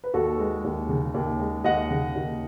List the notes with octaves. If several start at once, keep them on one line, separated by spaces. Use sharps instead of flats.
B4
D#2 F#4 A4
G#3
D#2
C#3
D#2
G#3
D#2 D#5 F#5
C#3
D#2